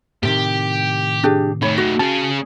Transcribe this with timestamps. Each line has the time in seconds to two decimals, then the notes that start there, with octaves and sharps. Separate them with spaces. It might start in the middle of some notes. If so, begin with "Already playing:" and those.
0.23 A2 C3 D#3 G4
1.23 D4 G4 G#4
1.62 A3 D#4 C#5 B5
1.78 F#4
1.99 C#4 G#4 A5